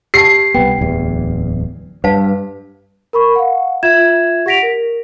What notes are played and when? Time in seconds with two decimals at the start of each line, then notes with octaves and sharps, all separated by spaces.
0.14 G4 A5 C7
0.54 C2 B3 G5
0.78 D1 E2
2.04 G2 B4 F5 A5
3.13 A#4 B5 C#6
3.36 F5 F#5
3.83 F4 E5 G#6 E7
4.46 G4 F#5 A#6 B6 D7 F7
4.63 A#4